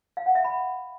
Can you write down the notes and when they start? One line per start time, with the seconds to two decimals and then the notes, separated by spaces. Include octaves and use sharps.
0.17 F5
0.26 F#5
0.35 E5
0.44 B5